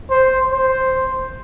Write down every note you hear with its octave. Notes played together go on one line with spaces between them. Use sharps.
C5
C5